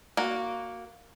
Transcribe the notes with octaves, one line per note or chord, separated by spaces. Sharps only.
A#3 F#4